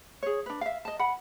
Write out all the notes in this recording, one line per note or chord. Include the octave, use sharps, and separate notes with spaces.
G#4 C#5
D4 B4
E5 F5
D#5 A5
F#5 B5